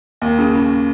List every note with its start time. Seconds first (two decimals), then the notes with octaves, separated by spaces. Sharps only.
0.22 D#2
0.39 C#3
0.54 C#3